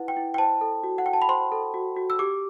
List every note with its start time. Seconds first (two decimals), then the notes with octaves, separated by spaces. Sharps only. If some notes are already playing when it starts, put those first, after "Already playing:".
Already playing: E4 B4 F#5
0.08 G5
0.17 E4
0.34 G5
0.38 C5 A5
0.61 A4
0.84 F#4
0.98 F#5
1.06 F#4 G5
1.13 A5
1.22 B5
1.28 C5 C6
1.52 A4
1.74 F#4
1.96 F#4
2.10 E6
2.19 G4 D6